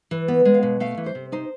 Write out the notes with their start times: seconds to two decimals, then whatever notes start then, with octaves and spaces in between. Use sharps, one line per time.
0.11 E3
0.28 B3
0.45 G#3
0.54 F5
0.63 B2
0.80 A3 F5
0.97 E3
1.06 C5
1.15 C3
1.32 D#4 C5